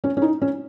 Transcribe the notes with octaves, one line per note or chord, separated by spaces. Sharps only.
C#4
C#4
D#4
C#4